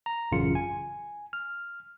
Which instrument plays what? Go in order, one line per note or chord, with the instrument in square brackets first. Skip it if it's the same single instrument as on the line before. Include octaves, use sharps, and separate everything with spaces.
[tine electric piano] A#5
A1 F#2 C#3 F4 C#7
G#5
F6